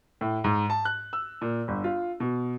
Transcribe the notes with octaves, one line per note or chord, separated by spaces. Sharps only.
A2
G#2
A5
F#6
E6
A#2
G1
F4
B2